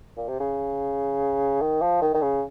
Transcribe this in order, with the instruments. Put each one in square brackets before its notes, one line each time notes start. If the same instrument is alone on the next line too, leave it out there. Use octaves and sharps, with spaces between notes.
[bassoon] A#2
C3
C#3
D#3
F3
D#3
D#3
C#3